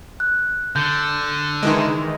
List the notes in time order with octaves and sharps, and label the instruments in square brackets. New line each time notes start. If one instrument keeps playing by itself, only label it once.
[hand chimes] F#6
[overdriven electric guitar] D3 [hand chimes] G6
[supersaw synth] D#3 E3 G#3